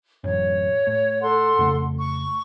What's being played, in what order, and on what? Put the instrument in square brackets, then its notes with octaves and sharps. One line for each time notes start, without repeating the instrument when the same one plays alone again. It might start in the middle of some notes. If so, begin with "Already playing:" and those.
[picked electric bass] A1 F#2 [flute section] C#5
[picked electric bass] A2
[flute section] A4 F#5 C6
[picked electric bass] F2 C#3 A3
[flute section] C#6